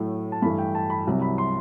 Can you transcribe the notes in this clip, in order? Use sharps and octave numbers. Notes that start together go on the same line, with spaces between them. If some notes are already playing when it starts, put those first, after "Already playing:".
Already playing: A2 F#3 A3
A5
G2 E3 A3 B5
G5
A5
B5
C2 C3 F#3
B5
C6